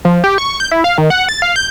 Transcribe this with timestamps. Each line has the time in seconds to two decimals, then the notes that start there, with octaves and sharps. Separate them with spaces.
0.05 F3
0.24 G4
0.38 C#6
0.60 G6
0.71 E4
0.84 F5
0.98 D#3
1.10 F#5
1.29 A6
1.42 F5
1.56 G6